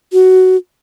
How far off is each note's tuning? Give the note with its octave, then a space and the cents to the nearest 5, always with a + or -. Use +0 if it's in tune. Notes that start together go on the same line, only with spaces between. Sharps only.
F#4 +10